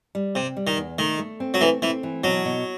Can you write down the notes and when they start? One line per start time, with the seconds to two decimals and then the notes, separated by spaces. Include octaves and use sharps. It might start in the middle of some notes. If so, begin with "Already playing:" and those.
0.15 G3
0.35 C3 C4
0.57 G3
0.67 D#3
0.77 E2
0.98 D#3 A3
1.19 A3
1.40 C4
1.54 F#3
1.61 E3 A3
1.82 E3 C4
2.03 E3
2.24 B2 F#3
2.45 B2